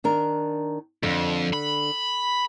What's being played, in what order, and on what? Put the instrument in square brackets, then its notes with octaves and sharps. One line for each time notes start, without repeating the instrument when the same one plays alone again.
[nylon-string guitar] D#3 D4 A#4
[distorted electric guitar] F2 [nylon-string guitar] D3
[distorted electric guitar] B5